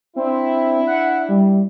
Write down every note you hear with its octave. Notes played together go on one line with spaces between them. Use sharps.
C4 D4 E4
F#5
G3